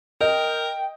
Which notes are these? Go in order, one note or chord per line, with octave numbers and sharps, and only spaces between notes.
A#4 D#5 G5